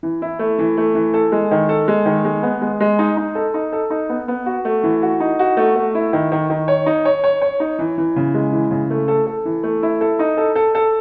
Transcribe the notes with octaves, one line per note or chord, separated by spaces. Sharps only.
E3
E4
A3
E3
A3
E3
A4
G#3
D#3
A4
G#3
D#3
G#3
B3
G#3
G#3
D#4
D#4
A4
D#4
A4
D#4
B3
B3
F#4
A3
E3
F#4
D#4
F#4
A3
A3
E4
D#3
D#3
D#3
C#5
D#4
C#5
C#5
C#5
D#4
E3
E3
C#3
G#3
E3
C#3
A3
A4
A4
E3
A3
E4
A4
D#4
A4
A4
A4